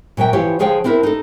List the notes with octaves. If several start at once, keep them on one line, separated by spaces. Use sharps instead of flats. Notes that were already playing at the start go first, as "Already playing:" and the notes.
A#2 F#3 E5 G5
E3 F3 E4 F4 G4 C#5
D3 F3 G#4 C#5 F5 G5
C4 D4 E4 A#4 E5
D#4 A4